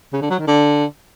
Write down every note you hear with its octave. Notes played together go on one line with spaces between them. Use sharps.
C#3
D3
F#3
D#3
D3